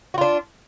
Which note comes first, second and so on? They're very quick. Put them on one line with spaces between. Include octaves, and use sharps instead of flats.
F#4 F4 D4